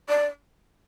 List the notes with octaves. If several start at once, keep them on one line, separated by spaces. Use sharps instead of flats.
D5